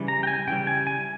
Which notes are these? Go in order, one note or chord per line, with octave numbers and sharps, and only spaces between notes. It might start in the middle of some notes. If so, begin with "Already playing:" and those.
Already playing: C#3 E3 G3
A#5
G5
G#5
C#3 E3 G3 G5
G#5
G#5